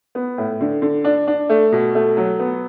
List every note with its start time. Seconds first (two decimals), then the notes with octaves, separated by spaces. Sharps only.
0.15 B3
0.38 A2
0.61 D3
0.82 D3
1.04 D4
1.27 D4
1.49 A3
1.72 B2
1.95 A3
2.17 F#3
2.39 B3